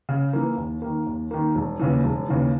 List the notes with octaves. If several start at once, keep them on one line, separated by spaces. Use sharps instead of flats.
C#3
E3 A#3
D#2
D#3 A#3
D#2
D#3 A#3
E1
D#2 C#3 E3
E1
D#2 C#3 E3